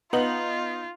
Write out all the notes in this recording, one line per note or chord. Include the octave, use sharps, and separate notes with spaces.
B3 D#4 F4 F#7